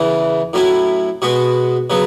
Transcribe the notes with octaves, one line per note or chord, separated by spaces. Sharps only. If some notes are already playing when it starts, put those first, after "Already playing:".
Already playing: E2 C#3 E3
A2 F#3 C#4 E4
B2 G#3 B3 F#4
C#3 F#3 B3